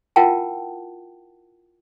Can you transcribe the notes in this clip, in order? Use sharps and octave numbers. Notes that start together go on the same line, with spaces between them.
E4 F4 A#4 F#5 G5 A5